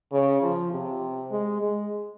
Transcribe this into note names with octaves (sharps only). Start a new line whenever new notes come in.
C#3
F3
C3
G#3
G#3